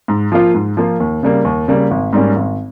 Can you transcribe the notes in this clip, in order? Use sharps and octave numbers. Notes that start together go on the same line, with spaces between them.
G#2
F3 A#3 F4
G#2
F3 A#3 F4
D#2
C#3 G3 A#3
D#2
C#3 G3 A#3
G#1
G#2 G3 A#3 C#4
G#1